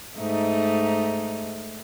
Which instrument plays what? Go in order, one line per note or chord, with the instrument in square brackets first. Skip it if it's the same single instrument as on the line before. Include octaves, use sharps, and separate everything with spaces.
[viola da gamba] G#2 A3 D#4